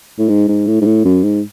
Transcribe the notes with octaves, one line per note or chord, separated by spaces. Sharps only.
A2
G#2
G#2
A2
G#2
A2
F#2
G#2